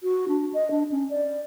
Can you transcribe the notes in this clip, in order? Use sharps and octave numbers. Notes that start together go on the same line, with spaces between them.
F#4
D4
D#5
D4
C#4
D5